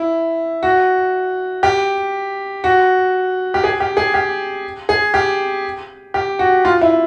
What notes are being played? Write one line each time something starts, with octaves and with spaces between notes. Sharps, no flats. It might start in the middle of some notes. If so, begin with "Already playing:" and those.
Already playing: E4
F#4
G4
F#4
G4
G#4
G4
G#4
G4
G#4
G4
G4
F#4
F4
E4